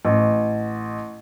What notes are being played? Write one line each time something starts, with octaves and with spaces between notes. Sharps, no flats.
A1